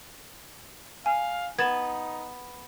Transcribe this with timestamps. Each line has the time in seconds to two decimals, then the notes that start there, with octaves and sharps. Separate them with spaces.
1.06 F5 G#5
1.58 B3 D#4 G#6 A6 E7